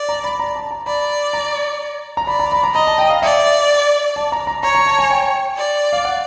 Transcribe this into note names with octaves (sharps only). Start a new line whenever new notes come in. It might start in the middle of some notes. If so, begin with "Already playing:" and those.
Already playing: D5
A#5
B5
A#5
A5
A#5
D5 B5
A#5
A#5
D5 B5
A#5
B5
A#5
D#5 A#5
A5
G5
F5
D5 E5
A5
A#5
A#5
C#5 A#5
A#5
A5
G#5
G5
D5
F5
F#5